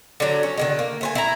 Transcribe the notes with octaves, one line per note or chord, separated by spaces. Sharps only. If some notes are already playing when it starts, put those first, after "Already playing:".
D3 F#3
C#4
D3 D#3 G#3
A#3
A3 C5 G#5
E4 A#5